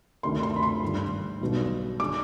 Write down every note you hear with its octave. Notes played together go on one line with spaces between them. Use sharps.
D2 C3 D#3 C6
C6
B5
C6
G#1 G2 D3 G3
B1 B2 G3
D3 G#3 D6